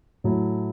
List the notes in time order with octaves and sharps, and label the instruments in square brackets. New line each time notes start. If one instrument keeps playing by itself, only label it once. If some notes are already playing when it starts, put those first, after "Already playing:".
[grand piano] A2 F#3 A3 E4